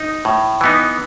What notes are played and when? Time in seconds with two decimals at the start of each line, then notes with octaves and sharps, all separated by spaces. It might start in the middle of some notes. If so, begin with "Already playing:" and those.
Already playing: D#4
0.25 A2
0.61 E3 B3 D#4